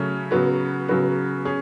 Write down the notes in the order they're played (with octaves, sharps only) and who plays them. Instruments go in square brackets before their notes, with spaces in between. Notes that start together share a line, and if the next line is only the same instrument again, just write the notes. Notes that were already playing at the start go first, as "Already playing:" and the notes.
Already playing: [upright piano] C#3 F#3 A3 C#4
C#3 F#3 B3 F#4
C#3 F#3 B3 F#4
C#4 G#4